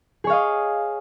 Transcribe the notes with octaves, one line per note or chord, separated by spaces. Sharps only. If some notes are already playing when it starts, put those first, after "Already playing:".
G#4 C#5 D#5 F5